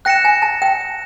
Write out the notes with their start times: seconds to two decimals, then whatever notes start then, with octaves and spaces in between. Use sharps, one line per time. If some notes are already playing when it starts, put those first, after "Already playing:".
0.05 G5 F#6 A#6 C#7 E7
0.25 G#5
0.42 A5
0.62 G5